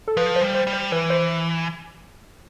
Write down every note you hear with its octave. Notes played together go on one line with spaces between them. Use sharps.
A4
F3 B4
C5
G3
C5
G3
C5
E3 B4
C5